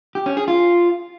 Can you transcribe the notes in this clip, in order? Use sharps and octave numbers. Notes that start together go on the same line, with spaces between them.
G4
C#4
G#4
F4